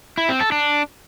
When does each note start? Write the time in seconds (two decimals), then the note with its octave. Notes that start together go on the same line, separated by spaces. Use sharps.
0.18 E4
0.29 C4
0.40 A4
0.52 D4